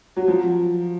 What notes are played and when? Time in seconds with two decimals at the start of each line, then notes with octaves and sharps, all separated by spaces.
0.17 F#3
0.28 F3